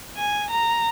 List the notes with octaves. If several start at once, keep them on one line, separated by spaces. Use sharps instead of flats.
G#5
A#5